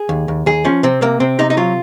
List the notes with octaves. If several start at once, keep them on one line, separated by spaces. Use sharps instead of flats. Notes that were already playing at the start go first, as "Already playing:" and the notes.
Already playing: G#4
D#2
D#2
D#2 G#4
F3 C#4
C3 C4
C3 A#3
C3 C4
C3 D#4
D#4
F#3 F4